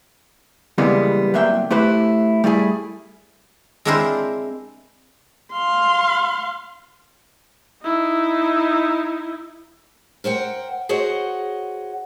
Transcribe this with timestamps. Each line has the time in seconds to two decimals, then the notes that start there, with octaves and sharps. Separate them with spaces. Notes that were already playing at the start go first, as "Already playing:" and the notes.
0.78 C#3 E3 G3 G#3 A#3 B3
1.34 C2 F#3 A#3 E5 G5
1.71 A3 E4 G4 B4 C5
2.44 G3 A3 E4 G#4
3.85 G#3 C4 D4 E4 A#4 C5
5.53 F5 C6
7.83 D#4 E4
10.24 A#4 C5 F#5 G5
10.89 F#4 G#4 C5 C#5 D#5 F#5